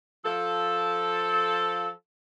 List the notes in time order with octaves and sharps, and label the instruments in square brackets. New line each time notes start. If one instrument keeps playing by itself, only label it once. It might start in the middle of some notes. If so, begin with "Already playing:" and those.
[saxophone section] F3 A4